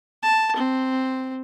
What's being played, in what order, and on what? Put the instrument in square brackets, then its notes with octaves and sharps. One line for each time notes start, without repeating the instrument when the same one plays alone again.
[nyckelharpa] A5
C4